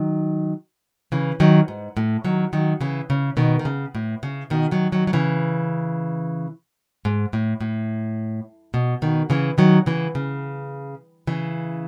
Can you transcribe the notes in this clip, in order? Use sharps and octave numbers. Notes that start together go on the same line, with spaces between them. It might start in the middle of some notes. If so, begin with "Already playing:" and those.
Already playing: D#3 F#3
C#3 E3
D#3 F#3
G#2
A2
D#3 F#3
D#3 F#3
C#3 E3
C#3
B2 D#3
D#3
C#3
A2
C#3
B2 D#3
D#3 F#3
D#3 F#3
F#3
C#3 E3
G#2
A2
A2
B2
B2 D#3
C#3 E3
D#3 F#3
C#3 E3
C#3
C#3 E3